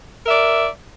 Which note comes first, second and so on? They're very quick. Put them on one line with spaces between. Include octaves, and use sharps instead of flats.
A#4 E5 D5